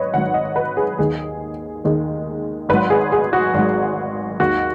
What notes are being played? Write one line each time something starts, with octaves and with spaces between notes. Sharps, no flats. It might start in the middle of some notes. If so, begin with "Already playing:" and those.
Already playing: G#1 G#2 F#3 B4 C#5 D#5
G#1 G#2 D#3 F#3 F#5
D#5
B4
G#4
D#2 D#3 G#3 G#4
D#2 D#3 G#3
G#1 G#2 F#3 B4
G#4
G#4
F#4
G#1 G#2 F#3
D#2 D#3 G#3 F#4